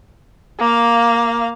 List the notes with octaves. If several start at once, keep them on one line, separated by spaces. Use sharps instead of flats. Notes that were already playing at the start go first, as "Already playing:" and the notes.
A#3 F5